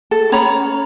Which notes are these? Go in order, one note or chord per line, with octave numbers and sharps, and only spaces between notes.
A4
C#4 C#5 A#5 B5